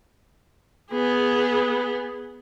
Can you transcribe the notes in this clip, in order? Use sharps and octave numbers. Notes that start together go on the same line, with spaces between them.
B3 G#4